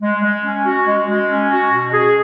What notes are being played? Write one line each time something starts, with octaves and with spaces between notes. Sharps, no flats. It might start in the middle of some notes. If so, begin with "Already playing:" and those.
G#3
G#3
C#4
F#4
G#3
G#3
C#4
F#4
B2
G#4